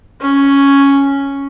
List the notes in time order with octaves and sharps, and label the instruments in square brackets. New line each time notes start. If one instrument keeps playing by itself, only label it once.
[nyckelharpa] C#4